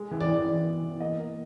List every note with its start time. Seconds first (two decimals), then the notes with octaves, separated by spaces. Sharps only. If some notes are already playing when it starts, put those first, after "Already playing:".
Already playing: G#3
0.11 E3
0.20 D5
0.29 E3
0.47 E3
0.65 B3
0.82 E3
1.00 A#3 D#5
1.18 A#3